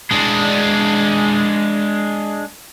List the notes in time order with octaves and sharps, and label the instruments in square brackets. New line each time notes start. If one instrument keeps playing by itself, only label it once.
[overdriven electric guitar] G#3 D4